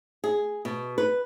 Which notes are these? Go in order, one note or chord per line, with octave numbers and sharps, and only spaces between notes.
G#4
B2
B4